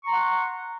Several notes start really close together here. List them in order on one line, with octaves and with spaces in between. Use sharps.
C#6 A#5 C6 F#5